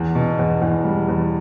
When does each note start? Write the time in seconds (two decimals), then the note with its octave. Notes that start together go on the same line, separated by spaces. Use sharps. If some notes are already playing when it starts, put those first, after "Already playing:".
Already playing: E2
0.15 B2
0.39 E2
0.62 E2
0.84 G3
1.08 E2